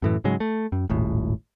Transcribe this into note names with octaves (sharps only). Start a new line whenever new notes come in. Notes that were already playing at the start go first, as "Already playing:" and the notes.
F#2 A2 E3
G#2 C#3 F#3 G#3
A3
F#2
D#1 G#1 A2